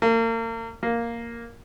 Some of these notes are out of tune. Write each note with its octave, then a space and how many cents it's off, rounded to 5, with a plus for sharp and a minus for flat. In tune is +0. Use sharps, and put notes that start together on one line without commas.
A#3 -35
A#3 +0